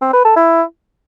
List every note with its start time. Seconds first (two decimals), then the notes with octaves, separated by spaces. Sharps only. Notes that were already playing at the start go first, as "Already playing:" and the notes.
0.02 C4
0.13 B4
0.25 A4
0.36 E4